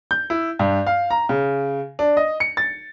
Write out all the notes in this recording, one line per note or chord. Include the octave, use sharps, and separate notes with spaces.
G6
E4
G2
F5
A#5
C#3
D4
D#5
C#7
A6